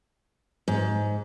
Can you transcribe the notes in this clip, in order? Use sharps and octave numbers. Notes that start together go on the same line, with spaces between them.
G#2